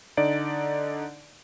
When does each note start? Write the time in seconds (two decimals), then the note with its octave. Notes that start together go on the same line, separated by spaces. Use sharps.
0.17 D3 D#4 D5 D7